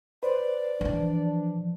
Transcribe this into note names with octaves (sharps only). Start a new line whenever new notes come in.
B4 C5 D5
E3 F3 D4